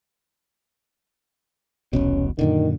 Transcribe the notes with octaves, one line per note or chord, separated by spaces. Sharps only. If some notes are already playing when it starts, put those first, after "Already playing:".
E1 C2 B2 C#4
F#2 A#2 D3 D#3